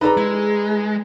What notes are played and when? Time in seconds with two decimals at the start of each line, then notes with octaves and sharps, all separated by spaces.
0.01 D#4 G#4 A4 B4 D5 A#5
0.17 G#3 E4